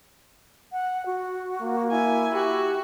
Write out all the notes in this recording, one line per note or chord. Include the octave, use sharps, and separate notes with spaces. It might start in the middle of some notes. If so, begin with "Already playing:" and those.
F#5
F#4
A#3
E4 G#5
F#4 G4